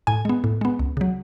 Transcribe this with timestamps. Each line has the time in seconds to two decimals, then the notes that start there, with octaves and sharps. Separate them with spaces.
0.07 A2 G#5
0.25 G#3 B3
0.44 A2
0.61 G#3 B3
0.79 C#2
0.97 C#3 F#3